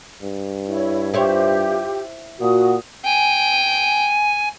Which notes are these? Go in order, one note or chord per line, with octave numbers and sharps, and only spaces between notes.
G2
E4 C#5
E4 F4 G4 C5 C#5
A#2 F#4 D#6
G5 G#5